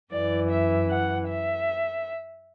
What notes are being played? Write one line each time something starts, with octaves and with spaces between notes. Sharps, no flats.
F#2 E3 D5
E5
F#5
E5